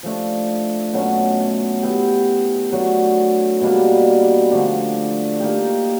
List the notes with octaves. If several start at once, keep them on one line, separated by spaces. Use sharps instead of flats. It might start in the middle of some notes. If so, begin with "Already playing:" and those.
F3 A3 D4
B2 F#3 A3 C#4
B3 E4 G4
F#3 A3 D4
B2 G3 A#3 D4
D3 F3 A3 D4
A#3 D#4 G4